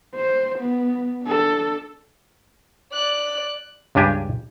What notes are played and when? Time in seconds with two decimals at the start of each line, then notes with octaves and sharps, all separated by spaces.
0.15 C5
0.59 B3
1.23 D4 A4
2.93 D5 F#6
3.95 C#2 G2 D4 G4 G#5